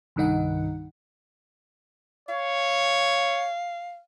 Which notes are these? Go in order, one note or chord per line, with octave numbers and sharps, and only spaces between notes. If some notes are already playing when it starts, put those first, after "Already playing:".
C2 G2 D#3 D#4 F#5
C#5 F5